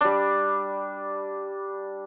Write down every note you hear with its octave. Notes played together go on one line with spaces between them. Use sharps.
G3 D4